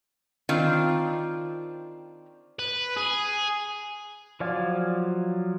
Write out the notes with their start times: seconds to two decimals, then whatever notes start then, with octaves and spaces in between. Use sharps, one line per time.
0.49 D#3 C4 D4 F4
2.59 B4
2.97 G#4
4.40 F3 F#3 D5 F5 G#5